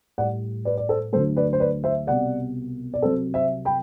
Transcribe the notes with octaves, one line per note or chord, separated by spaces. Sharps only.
A2 G3 D5 F#5
B4 D5
D5
A4 C5
D2 D3 F#3 A3 A4 C5
B4 D5
C5
B4 D5
C5 E5
C2 B2 G3 D5 F#5
D5
C2 C3 F#3 A4 C5
C5 E5
G5 B5